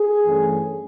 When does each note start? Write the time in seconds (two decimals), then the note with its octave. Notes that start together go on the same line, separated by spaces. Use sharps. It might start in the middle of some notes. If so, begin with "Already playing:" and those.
Already playing: G#4
0.25 G2 E3 A3 C#4